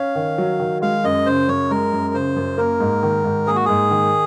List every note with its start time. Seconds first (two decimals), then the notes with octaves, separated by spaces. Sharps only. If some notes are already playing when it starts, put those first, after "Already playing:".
Already playing: C#4 F5
0.15 D#3
0.38 F#3
0.60 D#3
0.82 G#3 F5
1.04 F#2 D#5
1.26 C#3 C5
1.48 F#2 C#5
1.70 G#3 A#4
1.92 F#2
2.14 C#3 C5
2.36 F#2
2.58 A#3 A#4
2.80 G#2
3.03 D#3
3.24 G#2
3.47 A#3 G#4
3.56 F#4
3.65 G#2 G#4
3.91 D#3